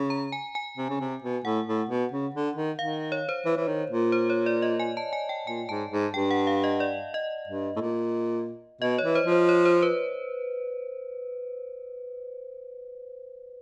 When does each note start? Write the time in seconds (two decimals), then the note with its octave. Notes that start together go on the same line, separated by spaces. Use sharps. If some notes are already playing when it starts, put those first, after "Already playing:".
Already playing: C#3
0.10 A#5
0.32 G#5
0.55 G#5
0.77 C3
0.90 C#3
1.00 C3
1.22 B2
1.44 A2 F#5
1.67 A2
1.89 B2
2.12 C#3
2.34 D3
2.56 D#3
2.79 D#3 F5
3.12 C#5
3.29 C5
3.46 E3
3.57 E3
3.68 D#3
3.90 A#2
4.12 C5
4.30 C#5
4.46 D5
4.62 D#5
4.80 G#5
4.97 A5
5.13 G#5
5.29 G5
5.47 A#2 G#5
5.69 G#2 A5
5.91 G#2
6.14 G2 G5
6.31 F#5
6.47 F5
6.64 D#5
6.80 D5
7.14 D#5
7.48 G2
7.77 A2
7.81 A#2
8.82 B2 D#5
8.98 C#5
9.04 E3
9.15 C5
9.26 F3
9.32 C5
9.49 C#5
9.65 C5
9.83 B4